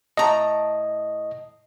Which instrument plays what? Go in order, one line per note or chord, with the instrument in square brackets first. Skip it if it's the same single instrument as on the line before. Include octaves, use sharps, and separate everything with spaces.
[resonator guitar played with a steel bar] A2 A#5 [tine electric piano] D#5